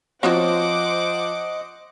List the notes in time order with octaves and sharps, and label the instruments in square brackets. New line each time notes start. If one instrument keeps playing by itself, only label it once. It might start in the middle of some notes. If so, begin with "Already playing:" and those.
[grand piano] F3 [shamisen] C4 F#4 C#5 [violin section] C5 F#5 D6 [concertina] D#5